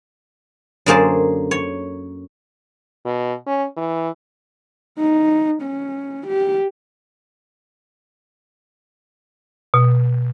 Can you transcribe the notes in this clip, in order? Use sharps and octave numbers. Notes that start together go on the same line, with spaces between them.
F#2 D3 A#3 G#4 C5 A5
C#5
B2
C#4
E3
D#4
C#4
G4
B2